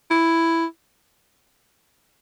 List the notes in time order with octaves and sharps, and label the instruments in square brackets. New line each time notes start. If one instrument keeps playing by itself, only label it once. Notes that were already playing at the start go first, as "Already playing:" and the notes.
[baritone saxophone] E4